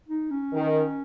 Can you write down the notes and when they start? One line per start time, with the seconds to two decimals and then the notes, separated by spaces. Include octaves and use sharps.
0.08 D#4
0.31 C#4
0.53 D#3